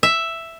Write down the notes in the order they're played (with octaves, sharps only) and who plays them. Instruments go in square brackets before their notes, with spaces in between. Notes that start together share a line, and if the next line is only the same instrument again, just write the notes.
[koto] E5